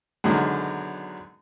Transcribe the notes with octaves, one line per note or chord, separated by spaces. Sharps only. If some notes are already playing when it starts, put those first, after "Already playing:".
F#2 B2 D3 D#3 F#3 G#3